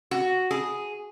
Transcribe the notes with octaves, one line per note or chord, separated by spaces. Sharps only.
F#4
G#4